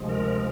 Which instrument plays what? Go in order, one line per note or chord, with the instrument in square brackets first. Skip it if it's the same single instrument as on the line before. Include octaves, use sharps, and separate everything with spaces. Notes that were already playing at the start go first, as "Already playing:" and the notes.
Already playing: [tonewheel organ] D2 C3 F3 G#3
A#4